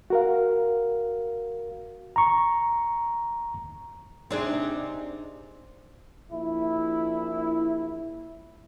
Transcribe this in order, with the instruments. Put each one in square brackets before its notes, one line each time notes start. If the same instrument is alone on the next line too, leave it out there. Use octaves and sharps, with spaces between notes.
[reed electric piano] F#4 A#4 F5
[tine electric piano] A#5 C#6
[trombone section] C3 [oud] C4 D4 G#4 [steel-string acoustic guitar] D#4 D5
[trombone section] A#1 E4